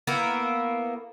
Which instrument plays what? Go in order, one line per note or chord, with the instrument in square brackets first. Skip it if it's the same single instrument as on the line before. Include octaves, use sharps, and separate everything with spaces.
[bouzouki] A#3 B3 E4